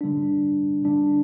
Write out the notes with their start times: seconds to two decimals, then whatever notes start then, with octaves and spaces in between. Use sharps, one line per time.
0.01 D3 G3 D4
0.84 D3 G3 D4